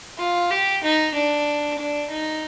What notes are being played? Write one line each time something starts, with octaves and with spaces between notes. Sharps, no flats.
F4
G4
D#4
D4
D4
D#4